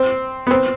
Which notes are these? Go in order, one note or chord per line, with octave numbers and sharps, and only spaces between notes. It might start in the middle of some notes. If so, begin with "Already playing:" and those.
Already playing: C4
B3
C4